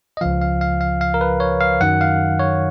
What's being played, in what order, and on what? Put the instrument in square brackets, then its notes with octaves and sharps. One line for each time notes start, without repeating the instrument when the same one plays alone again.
[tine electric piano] D#5
C#2 C#3 F3 F5
F5
F5
F5
F5
A#4
B4
C#5
F5
F#2 D#3 F#3 F#5
F5
C#5